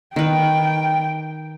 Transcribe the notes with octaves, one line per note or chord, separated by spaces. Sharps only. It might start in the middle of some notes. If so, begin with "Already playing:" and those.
D#3 B4 G5